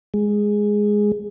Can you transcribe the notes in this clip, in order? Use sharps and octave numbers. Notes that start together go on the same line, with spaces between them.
G#3